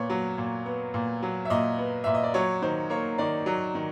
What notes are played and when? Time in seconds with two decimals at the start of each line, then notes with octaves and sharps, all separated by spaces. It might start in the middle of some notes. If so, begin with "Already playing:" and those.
Already playing: A#2 B3 C#5
0.10 F#3
0.38 A#2
0.66 B3
0.94 A#2
1.22 F#3
1.45 E5
1.50 A#2 D#5
1.78 B3
2.04 A#2 E5
2.15 D#5
2.24 D5
2.34 F#3 C#5
2.62 D#3 C5
2.90 A#3 C#5
3.18 D#3 D5
3.46 F#3
3.75 D#3